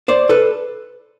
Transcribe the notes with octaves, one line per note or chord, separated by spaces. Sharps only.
C5 D5
A4 B4